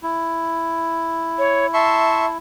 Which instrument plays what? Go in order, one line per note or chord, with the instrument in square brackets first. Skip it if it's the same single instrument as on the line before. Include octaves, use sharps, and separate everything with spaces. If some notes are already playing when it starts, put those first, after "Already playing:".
[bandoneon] E4
[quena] C#5
[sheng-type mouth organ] E5 C6 C#6 [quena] A5